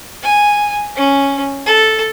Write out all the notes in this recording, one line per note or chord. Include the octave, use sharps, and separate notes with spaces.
G#5
C#4
A4